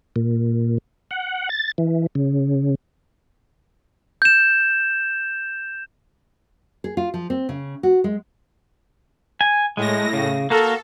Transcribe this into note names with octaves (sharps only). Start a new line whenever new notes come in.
A#2
F#5
A6
E3
C#3
G6 E7
G#4
F4
F3
C4
C#3
F#4
G#3
G#5
A2 G#3 A#6
C#3
A#3 F#4 A4 A#4